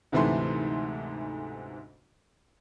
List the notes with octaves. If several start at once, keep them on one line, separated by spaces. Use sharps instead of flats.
D2 G#2 C3 E3 A3 C6